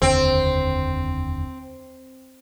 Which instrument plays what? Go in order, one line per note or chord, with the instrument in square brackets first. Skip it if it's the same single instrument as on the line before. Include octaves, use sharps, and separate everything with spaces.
[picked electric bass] F1 D#2 D3 [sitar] C4